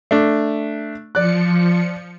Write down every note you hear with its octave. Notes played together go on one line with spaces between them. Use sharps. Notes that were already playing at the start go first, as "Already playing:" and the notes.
A3 D4
F3 D5 F#6 C#7